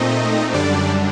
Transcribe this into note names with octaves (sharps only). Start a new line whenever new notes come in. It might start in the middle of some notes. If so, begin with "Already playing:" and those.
Already playing: A#2 A3 C4 D#4 D#5
F#2 D3 G3 D4 D5